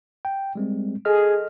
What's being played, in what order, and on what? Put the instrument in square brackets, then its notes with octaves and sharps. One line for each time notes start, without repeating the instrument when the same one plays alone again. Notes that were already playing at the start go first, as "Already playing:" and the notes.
[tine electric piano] G5
G3 G#3 C4
[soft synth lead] G#4 [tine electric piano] A4 D#5 F6